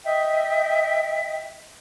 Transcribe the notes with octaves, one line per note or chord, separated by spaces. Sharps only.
D#5 E5 G5